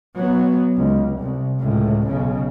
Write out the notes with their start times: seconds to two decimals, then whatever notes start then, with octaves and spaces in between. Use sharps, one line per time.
0.16 F#3 B3
0.76 C#2
1.20 C2
1.60 C#2 A2
2.07 B1 C#3